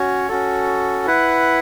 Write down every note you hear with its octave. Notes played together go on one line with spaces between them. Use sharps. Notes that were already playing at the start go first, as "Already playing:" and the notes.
Already playing: C#4 F#4 C#5
C#4 F#4 A4
E4 B4 F#5